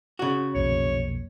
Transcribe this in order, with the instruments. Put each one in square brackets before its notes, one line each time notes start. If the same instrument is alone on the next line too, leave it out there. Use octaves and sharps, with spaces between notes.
[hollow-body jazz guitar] C#3 F#4
[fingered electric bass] B1 F2 A#2 [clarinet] C#5